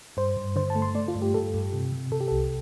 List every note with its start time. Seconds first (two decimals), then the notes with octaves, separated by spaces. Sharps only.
0.17 G2 C5
0.37 G2
0.56 D3 C5
0.70 A5
0.75 A3
0.82 C6
0.95 A3 D5
1.08 F4
1.15 G2
1.22 G4
1.34 G2 A4
1.54 G2
1.73 C3
1.92 C3
2.12 C3 A4
2.21 G4
2.28 C2 A4